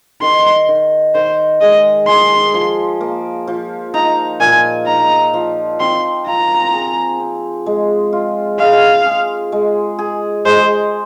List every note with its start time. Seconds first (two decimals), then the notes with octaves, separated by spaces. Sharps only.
0.22 D#3 C6
0.68 D#3
1.15 D#3 C5
1.61 G#3 D#5
2.08 G#4 C6
2.54 F3
3.01 A#3
3.47 F3
3.94 D#4 A#5
4.41 A#2 G#5
4.87 D#4 A#5
5.33 F3
5.80 C4 C6
6.26 F4 A#5
6.73 G#4
7.20 C4
7.66 G#3
8.13 F4
8.59 G#3 F5
9.06 G#4
9.52 G#3
9.99 G#4
10.45 G#3 C5